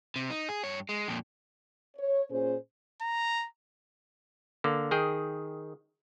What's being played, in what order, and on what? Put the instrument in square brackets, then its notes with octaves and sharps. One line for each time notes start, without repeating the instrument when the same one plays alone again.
[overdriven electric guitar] C3
D#4
G#4
G2 C#5
G#3
F2 A#2
[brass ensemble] C#5
A#2 C#4 G#4 C5
[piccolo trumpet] A#5
[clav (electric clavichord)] D3 A#3
D#3 G#4 G5